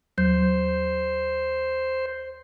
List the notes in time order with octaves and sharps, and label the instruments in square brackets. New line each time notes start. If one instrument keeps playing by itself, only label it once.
[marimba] D#2 F#3 G6 [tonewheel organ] C5